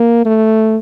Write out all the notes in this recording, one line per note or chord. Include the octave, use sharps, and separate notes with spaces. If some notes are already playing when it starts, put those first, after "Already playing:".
Already playing: A#3
A3